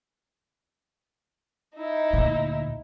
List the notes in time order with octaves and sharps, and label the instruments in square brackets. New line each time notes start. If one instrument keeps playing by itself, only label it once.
[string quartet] D#4 E4
[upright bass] D2 A#2